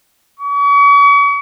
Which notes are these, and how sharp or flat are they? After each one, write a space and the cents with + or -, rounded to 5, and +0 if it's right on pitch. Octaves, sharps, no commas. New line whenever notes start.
C#6 +40